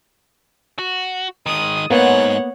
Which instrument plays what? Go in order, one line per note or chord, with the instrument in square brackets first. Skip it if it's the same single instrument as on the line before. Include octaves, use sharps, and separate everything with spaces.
[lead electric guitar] F#4
[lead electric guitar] D#3 G#3 [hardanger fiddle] D#6
[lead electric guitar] G#2 [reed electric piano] A#3 B3 [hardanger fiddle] C#5 F#5